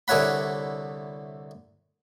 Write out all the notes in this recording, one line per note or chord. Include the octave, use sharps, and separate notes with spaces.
C2 D3 E4 C#5 F#5 B5